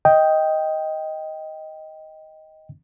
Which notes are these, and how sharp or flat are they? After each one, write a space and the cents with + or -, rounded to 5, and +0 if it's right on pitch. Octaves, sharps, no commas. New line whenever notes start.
D#5 +10 G5 +0